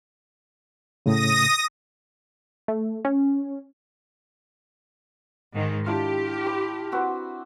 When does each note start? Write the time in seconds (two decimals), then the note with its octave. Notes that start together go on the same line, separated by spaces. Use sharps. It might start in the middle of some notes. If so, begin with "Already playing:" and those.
1.06 A2 C#3 D#6 A#6
2.68 A3
3.05 C#4
5.53 G#2 D#3 G#3
5.86 D4 E4 F4 G4
6.46 B5 D6
6.92 C4 F#4 B4